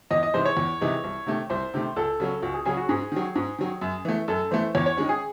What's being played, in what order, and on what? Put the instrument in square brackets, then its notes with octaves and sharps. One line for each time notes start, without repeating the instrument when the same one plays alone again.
[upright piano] E2 [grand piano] D#5
[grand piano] D#5
[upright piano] C3 E3 G#3 D#4 [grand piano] C5
[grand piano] C#5
[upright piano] E2
C3 E3 G#3 D#4
C2
C3 D#3 A3
[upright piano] C2 [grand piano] C5
[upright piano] C3 D#3 A3
[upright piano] C#2 [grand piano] A4
[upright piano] C#3 F#3 C#4
[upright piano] C#2 [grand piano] F#4
[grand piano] G#4
[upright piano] C#3 F#3 C#4 [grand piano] G#4
[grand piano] F#4
[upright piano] G#2 [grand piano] G#4
[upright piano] D#3 F#3
G#2
D#3 F#3
F#2
E3 A3
[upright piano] F#2 [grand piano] A4
[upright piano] E3 A3 [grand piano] C5
[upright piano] E2 [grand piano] C#5
[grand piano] C#5
[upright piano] D#3 G#3 C#4
[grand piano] G#4